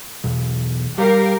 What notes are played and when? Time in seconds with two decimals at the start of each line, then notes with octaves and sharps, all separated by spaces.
0.24 B1 E2
0.98 G3 G4 A#4 F5